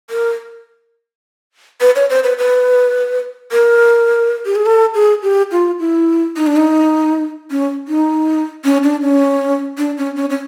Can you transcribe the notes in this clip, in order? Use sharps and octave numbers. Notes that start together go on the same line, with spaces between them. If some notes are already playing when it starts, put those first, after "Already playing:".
A#4
B4
C#5
C5
B4
B4
A#4
G4
G#4
A4
G#4
G4
F4
E4
D#4
D4
D#4
C#4
D#4
C#4
D4
C#4
D4
C#4
C#4
C#4